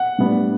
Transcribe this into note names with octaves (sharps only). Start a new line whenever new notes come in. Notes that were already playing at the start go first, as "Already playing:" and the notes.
Already playing: F#5
A2 G3 B3 D4